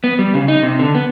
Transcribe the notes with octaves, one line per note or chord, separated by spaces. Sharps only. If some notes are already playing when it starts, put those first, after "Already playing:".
B3
G3
C#3
D#4
C3
D3
B3